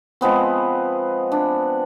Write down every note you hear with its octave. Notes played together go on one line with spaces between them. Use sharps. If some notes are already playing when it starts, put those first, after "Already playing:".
F3 G#3 B3 C4
D4